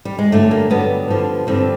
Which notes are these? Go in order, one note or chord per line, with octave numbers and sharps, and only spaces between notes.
G3
G#3
G2 D3 F#3 A3
A#3
G2 D3 F#3 B3
G2 D3 F3
G2 D3 F3 C4